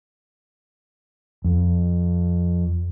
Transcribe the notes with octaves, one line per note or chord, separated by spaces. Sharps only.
F2